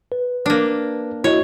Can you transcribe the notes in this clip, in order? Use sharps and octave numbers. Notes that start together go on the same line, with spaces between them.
B4
A#3 D4
E4 F#4 C#5 D#5